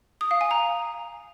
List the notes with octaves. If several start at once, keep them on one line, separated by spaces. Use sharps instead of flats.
D#6
F5
G#5
A#5